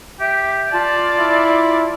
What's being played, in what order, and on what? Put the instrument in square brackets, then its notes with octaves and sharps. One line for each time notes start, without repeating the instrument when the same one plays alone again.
[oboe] G4 [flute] E5
[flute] F4 [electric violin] D5 [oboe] A5
[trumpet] E4